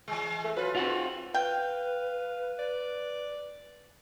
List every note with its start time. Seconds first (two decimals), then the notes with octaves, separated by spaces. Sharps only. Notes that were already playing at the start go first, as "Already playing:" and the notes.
0.08 E3 G#3
0.44 A3
0.56 F#3 F4 B4
0.75 B2 G#3 C4 F4 F#5
1.34 B4 F5 G5
2.59 D5